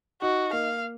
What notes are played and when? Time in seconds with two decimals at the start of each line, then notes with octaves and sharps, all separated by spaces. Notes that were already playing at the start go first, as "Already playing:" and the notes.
0.22 D#4 F#4
0.53 A#3 F5